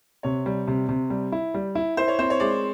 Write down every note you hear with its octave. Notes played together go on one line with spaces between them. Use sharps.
C3 C#5
G3
C3
C3
G3
E4
G3
E4
E4 C5
C#5
C4 C5
C#5
G#3 D5